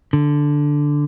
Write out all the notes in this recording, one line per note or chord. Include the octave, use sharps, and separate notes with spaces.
D3